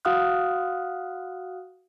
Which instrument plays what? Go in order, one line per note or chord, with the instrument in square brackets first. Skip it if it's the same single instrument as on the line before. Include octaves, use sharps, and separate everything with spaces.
[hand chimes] F#4 F5 F#5 D#6 F6 F#6